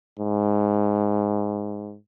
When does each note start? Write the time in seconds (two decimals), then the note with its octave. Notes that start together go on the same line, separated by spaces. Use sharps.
0.19 G#2